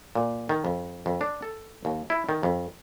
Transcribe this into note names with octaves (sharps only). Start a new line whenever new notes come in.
A#2
D#3
F2
F2
D4
A4
D#2
E4
D#3
F2